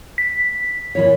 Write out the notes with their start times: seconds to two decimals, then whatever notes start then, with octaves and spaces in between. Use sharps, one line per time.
0.18 B6
0.95 A#2 E3 C#5